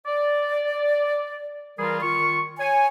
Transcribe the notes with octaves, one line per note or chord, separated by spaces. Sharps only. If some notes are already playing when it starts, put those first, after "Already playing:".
D5
E3 G3 F4 G#4 A#4
D#3 F4 C#6
C#5 G#5